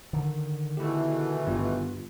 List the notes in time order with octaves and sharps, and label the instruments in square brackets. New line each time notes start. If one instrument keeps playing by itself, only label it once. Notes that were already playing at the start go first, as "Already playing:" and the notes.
[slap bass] D3 D#3
[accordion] B2 E3 A3 [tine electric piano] E4 G4
[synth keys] G1 G2 [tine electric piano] B3 F4 G4